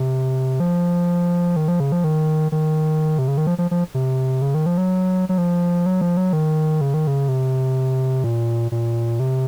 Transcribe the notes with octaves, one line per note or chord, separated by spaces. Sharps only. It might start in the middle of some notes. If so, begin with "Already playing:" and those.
Already playing: C3
F3
D#3
F3
C#3
F3
D#3
D#3
C3
C#3
D#3
F3
F3
F3
C3
C#3
D#3
F3
F#3
F#3
F3
F#3
F3
F#3
D#3
C#3
D#3
C#3
C3
A#2
A#2
C3